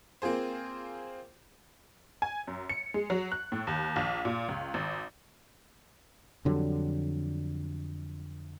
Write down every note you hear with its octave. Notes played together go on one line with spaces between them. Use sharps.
A#3 C4 F4 G#4 C5
G#5
F#2
C#7
G#3
F#3
F#6
A2
D#2
A#1
A#2
C#2
G#1
F2 D3 F#3 G3